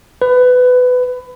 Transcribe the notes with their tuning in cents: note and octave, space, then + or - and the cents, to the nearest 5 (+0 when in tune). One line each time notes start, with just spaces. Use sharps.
B4 +20